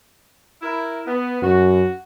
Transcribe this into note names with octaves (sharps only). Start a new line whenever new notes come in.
E4 A#4
B3
F#2 F#4